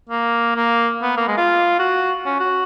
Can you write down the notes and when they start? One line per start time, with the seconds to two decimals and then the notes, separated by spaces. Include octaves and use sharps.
0.10 A#3
0.56 A#3
1.02 B3
1.17 A#3
1.28 G#3
1.37 F4
1.79 F#4
2.26 C#4
2.40 F#4